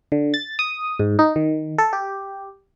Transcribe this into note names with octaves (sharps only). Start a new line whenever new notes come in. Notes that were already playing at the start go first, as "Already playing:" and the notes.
D3
A6
D#6
G#2
D#4
D#3
A4
G4